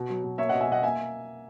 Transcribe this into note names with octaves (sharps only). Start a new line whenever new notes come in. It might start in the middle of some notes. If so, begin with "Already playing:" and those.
Already playing: B2
F#3
B2
A#3 C#5 E5
B2 D#5 F#5
E5 G#5
B2 D#5 F#5
A#3 E5 G#5